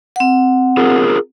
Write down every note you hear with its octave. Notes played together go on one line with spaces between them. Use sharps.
C4 F#5
F4 G#4 A#4